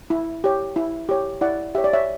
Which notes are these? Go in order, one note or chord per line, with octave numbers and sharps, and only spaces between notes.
E4
G4 C#5
E4
G4 C#5
E4 D5 F#5
G4 C#5 E5
D5
C#5 E5